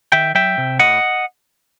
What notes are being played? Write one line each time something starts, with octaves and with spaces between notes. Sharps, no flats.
D#3 E5 G5
F#3 E5 G5
C3
A2 D#5 F#5